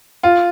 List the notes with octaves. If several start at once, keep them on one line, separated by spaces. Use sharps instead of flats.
F4